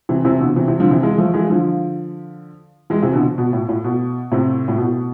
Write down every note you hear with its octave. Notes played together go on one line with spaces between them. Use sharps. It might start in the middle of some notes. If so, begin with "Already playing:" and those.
C3 E3
C3 E3
B2 D3
C3 E3
C3 E3
D3 F3
C3 E3
E3 G#3
F3 A3
E3 G#3
D3 F3
E3 G#3
C3 E3
B2 D3
B2
A2
A2
B2
A2 C3
A2
B2